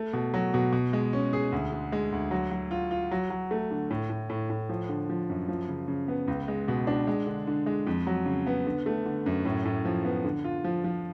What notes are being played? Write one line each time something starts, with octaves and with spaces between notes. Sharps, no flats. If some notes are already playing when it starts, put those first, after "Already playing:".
Already playing: A3
B2
F#3
B2
B2
G#3
C#4
G#4
D2
D3
G#3
D2
F#3
F#3
F4
F4
F#3
F#3
A3
D3
A2
A2
A2
A2
F3
D3
F3
F#2
F3
C#3
C#3
B3
C#2
G#3
B2
D4
G#3
D3
D3
G#3
F2
F#3
C#3
B3
D3
A3
D3
F#2
A2
A2
F3
B3
D3
F4
F3
F3